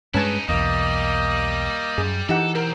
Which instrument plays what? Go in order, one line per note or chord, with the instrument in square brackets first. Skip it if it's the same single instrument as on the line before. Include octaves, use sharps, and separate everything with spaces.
[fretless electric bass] G2 G#3 [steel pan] C#4 G#5 A5 [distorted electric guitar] D#4 E4 [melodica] B4
[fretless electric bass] B1 E2 [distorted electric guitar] G3 [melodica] A#3 D#5 D#6
[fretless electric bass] F#2 [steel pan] G#4
[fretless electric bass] E3 [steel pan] D#4 G4 F#5 [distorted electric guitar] A4
[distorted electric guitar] B1 C4 [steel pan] A#4